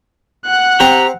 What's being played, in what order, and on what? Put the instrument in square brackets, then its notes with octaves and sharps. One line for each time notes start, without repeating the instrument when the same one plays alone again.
[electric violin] F#5 F#6
[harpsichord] C4 [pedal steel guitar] G4 A#5